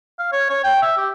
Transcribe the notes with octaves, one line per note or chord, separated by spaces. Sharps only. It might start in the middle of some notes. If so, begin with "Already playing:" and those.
F5
C#5
C#5
G5
E5
G4